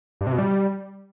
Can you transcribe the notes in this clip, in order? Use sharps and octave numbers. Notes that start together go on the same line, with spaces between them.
G2
C3
B2
G3